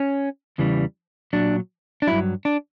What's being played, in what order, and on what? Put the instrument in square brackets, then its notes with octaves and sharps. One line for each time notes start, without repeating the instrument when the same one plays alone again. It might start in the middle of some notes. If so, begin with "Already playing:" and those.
Already playing: [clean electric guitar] C#4
E2 C#3 E3 G3
A#2 F#3 D4
D4
G2 F#3 E4
D4